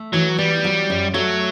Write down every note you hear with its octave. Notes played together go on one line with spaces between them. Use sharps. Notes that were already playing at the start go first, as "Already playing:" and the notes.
Already playing: A3
E3 F#3
G3 B3
F#3
F#2
F#3 A3